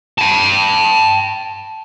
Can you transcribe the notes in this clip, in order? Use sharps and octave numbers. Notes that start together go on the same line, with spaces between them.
G5 A5